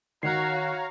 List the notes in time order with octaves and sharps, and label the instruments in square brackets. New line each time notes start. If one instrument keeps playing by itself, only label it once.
[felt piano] D#3 [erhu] F#4 [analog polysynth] C#5 F5 A#5 [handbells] F#6 C7